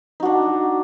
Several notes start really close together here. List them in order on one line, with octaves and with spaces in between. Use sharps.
D#4 F#4 D4